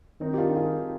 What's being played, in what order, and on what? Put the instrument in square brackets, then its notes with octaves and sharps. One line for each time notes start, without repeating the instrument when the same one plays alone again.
[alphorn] D#3 [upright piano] C4 D#4
[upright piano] G4
D4 F4
F4 G#4